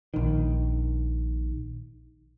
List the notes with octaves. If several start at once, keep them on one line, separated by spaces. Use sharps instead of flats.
A#1 D#3